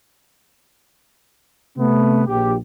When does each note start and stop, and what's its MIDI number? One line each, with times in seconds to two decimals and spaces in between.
1.77 2.22 48
1.77 2.22 57
1.77 2.22 59
2.27 2.55 34
2.27 2.55 67